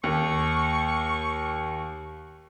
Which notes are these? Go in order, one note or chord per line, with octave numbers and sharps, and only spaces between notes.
D#2 C#6